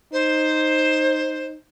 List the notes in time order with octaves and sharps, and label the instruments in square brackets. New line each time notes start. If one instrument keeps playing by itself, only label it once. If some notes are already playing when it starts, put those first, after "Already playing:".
[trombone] D#4 [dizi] C5